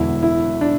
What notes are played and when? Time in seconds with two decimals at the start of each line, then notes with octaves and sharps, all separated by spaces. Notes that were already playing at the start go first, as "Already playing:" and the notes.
Already playing: E1 E2 D3 E4
0.23 E4
0.61 D4